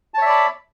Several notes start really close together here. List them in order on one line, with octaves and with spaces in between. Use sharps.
A5 C#5 E5 D5 B5